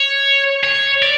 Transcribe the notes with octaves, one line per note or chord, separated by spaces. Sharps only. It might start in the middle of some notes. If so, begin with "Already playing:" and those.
Already playing: C#5
C#5
D5